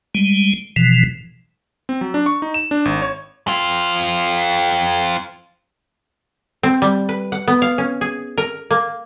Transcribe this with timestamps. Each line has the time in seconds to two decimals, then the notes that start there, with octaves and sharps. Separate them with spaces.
0.14 G3 G#3
0.76 B2 E3 F3
1.89 C4
2.01 F#3
2.14 D4
2.26 C#6
2.42 D#4
2.54 E7
2.71 D4
2.85 G#1
3.02 C#5
3.48 C4 F4
6.63 C4
6.82 G3
7.09 B4
7.32 F#5
7.48 B3
7.62 F5
7.78 C#4
8.01 G#4
8.38 A#4
8.71 A#3